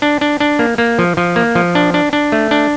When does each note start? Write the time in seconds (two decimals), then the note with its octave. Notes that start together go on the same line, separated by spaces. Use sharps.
0.02 D4
0.21 D4
0.40 D4
0.59 A#3
0.78 A#3
0.99 F3
1.17 F3
1.36 A#3
1.55 F3
1.75 D4
1.94 D4
2.13 D4
2.32 A3
2.51 D4